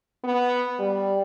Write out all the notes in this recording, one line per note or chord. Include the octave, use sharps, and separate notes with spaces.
B3
G3